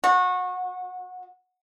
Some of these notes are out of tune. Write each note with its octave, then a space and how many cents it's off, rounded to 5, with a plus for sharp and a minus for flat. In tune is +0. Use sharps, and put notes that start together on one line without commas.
F#4 -25